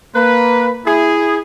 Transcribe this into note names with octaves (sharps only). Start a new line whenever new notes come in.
A#3 B4
E4 G#4